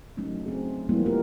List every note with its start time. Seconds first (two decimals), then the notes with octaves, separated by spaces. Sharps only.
0.17 F#3 A3 C#4 D#4
0.46 A3 C4 G#4
0.89 F3 G3 G#3 A#3 B3 E4
1.06 F4 G4 A#4